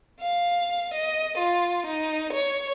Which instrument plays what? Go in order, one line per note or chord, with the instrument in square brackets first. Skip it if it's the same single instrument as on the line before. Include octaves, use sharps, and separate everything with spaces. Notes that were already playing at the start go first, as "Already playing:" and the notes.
[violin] F5
D#5
F4
D#4
C#5